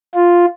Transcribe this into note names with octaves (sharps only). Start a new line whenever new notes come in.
F4